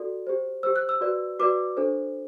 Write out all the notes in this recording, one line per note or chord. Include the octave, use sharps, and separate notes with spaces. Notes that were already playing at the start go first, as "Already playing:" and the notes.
Already playing: F#4 A4 D5
G4 C5
G4 C5 E6
F#6
E6
F#4 B4 D5
F#4 B4 D5 D6
D4 A4 C5